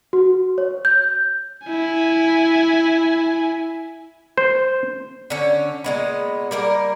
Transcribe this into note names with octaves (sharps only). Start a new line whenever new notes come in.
F#4
C#5
G6
E4 G#5
C5
D3 C#4
A#2 G#3 B3
G3 A#3 A#4